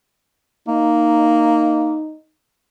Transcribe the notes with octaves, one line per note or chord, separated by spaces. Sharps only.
A#3 D#4